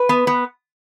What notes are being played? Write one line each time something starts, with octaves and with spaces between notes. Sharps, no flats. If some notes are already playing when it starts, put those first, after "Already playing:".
Already playing: B4
B3
B3